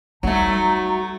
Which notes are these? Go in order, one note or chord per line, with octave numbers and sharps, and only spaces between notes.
F#3 G3 A3 D#4 A#5